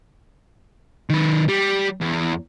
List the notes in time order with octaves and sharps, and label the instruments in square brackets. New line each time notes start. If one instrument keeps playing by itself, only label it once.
[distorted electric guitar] D#3 B4
G3
E2